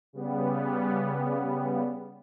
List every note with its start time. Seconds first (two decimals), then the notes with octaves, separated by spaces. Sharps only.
0.13 C#3 G3 B3